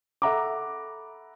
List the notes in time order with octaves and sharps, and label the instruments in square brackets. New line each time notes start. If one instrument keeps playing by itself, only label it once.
[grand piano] A4 E5 F#5 A#5 B5 D6